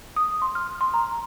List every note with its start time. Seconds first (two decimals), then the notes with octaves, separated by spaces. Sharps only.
0.16 D#6
0.42 C6
0.55 F6
0.81 C6
0.94 A#5